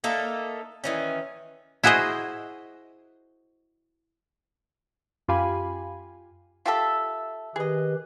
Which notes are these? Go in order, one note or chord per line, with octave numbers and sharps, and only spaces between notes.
A3 A#3 D#4 A4
D#3 E3 C#4
E4 F#4 G#4 C5 D#5
F#2 F4 G4 F5 G#5 B5
F4 G4 A4 E5 A5 E6
D#3 G4 G#4 B4 D#5